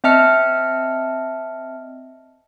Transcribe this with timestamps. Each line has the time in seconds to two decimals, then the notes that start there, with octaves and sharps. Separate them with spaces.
0.04 C4 D#5 E5 A5 F6 C#7